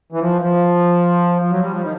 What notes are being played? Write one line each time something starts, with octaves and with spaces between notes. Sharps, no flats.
E3
F3
F3
F3
F#3
G3
F3
D#3